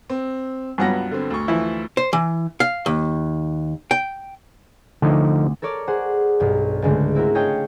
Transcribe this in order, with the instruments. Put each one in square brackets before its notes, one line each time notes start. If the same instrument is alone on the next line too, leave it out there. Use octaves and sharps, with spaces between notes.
[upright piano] C4
[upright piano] C#2 F#5 A#6 [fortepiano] G2 F#3 B3
[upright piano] D3 C4
D2 C#6
[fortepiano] E3 F3 E4
[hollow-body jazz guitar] C5
E3
F5
D#2
G5
[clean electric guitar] D2 [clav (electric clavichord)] D3 F3 D#4
[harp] A4 A#4 C#5 D5
G#4 C5 F#5
B1 G2
C#2 G#2 D3 G#3 A3
C4 E4 F#4 A#4
F4 G#4 C#5 D#5 G5 A5